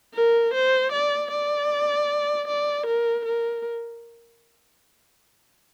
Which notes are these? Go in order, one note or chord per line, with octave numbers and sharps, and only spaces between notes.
A#4
C5
D5
D5
D5
A#4
A#4